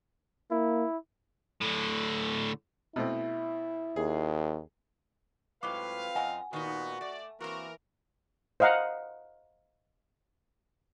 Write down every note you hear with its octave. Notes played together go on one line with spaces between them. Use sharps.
A#3 E4
A2 D3
B2 A3 C4 E4
D#2 G#4
A2 F#3 G#3 C4 F4 B4 F5 D6
F#2 D#5 F#5 G#5 A#5
A#2 D#3 B3 D#4 F#4
A3 D5
E3 A#3 C4 F#4 A#4
C5 D#5 F5 F#5 A#5